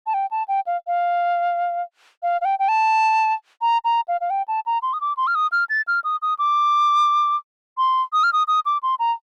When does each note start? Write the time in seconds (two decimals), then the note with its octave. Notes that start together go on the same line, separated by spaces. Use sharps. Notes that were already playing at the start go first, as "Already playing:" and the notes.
0.07 A5
0.14 G5
0.31 A5
0.48 G5
0.67 F5
0.87 F5
2.23 F5
2.41 F5
2.45 G5
2.59 G5
2.68 A5
3.62 A#5
3.84 A#5
4.08 F5
4.21 F5
4.30 G5
4.48 A5
4.66 A#5
4.82 C6
4.93 D#6
5.01 D6
5.17 C6
5.27 F6
5.35 D#6
5.52 F6
5.69 A6
5.88 F6
6.04 D#6
6.22 D#6
6.39 D6
7.78 C6
8.13 D#6
8.24 F6
8.33 D#6
8.48 D#6
8.66 D6
8.83 C6
8.99 A#5